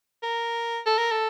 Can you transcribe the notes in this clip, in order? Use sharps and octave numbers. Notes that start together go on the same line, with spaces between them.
A#4
A4
A#4
A4